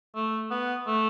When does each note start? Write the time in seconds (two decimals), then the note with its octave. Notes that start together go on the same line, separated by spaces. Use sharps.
0.15 A3
0.51 B3
0.87 A3